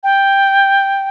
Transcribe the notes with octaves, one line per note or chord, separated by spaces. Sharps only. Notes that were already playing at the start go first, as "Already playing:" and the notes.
G5